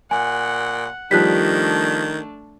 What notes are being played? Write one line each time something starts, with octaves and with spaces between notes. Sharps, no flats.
A#2 F#5 G#5
D#3 F3 G3 A3 D4 F#6 B6